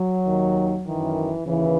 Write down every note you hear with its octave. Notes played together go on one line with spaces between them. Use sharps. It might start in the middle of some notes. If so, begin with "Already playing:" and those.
Already playing: F#3
D#2 D#3
F#2 D#3 E3
D#2 C#3 E3